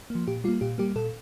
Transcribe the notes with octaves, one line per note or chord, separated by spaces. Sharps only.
A#3
F3
A#2 G4
G3 A#3 F4
A#2 G4
G3 A#3 G4
A#2 A4